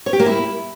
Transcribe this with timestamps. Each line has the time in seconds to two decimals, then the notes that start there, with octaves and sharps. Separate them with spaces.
0.06 C#5
0.13 G4
0.20 A#3
0.26 E4